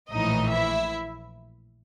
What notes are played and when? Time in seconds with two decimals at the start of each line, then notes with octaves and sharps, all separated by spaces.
0.10 A#1 A2 E3 D#4 D#5
0.51 E4 E5